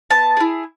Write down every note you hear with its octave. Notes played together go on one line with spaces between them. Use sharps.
B3 A5
E4 G#4